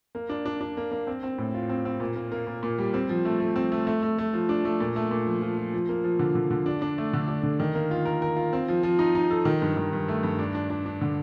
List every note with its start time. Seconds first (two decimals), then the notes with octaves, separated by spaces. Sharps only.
0.15 A#3
0.29 D4
0.45 D4
0.61 D4
0.77 A#3
0.92 A#3
1.07 C4
1.23 C4
1.38 A2
1.54 F4
1.69 C4
1.85 C4
2.00 A#2
2.16 A#3
2.32 A#3
2.47 A#2
2.63 A#2
2.78 G3
2.94 C4
3.09 F3
3.25 A3
3.40 A3
3.56 C4
3.72 A3
3.87 A3
4.03 A3
4.18 A3
4.33 F3
4.49 D4
4.65 A3
4.80 A#2
4.96 A3
5.11 A#2
5.27 F3
5.42 F3
5.57 F3
5.74 F3
5.89 A#3
6.04 F3
6.19 D3
6.35 D3
6.51 D3
6.66 D4
6.82 D4
6.98 A3
7.13 D3
7.28 D4
7.43 D3
7.60 D#3
7.75 A#3
7.91 F4
8.05 A#4
8.22 A#4
8.36 F4
8.53 C4
8.68 F3
8.83 F3
8.99 D#4
9.15 D#4
9.30 A4
9.45 D#3
9.62 G2
9.77 D#3
9.93 G2
10.08 A3
10.23 G2
10.39 D4
10.54 D4
10.70 D4
10.86 D4
11.01 D3